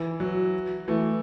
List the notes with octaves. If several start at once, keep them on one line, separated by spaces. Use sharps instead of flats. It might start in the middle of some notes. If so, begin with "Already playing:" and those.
Already playing: E3
F#3
E3 A3